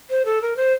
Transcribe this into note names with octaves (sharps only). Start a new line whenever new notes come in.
C5
A4
A#4
C5